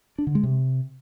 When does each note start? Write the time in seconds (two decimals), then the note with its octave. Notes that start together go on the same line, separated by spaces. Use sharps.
0.18 D4
0.27 D3
0.35 G#3
0.43 C3